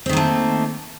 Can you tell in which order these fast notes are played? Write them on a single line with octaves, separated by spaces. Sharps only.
C4 D#3 A#3 A3